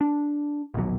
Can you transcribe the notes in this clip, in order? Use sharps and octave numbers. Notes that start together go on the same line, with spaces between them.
D4
A#1 D#2 B2 F#3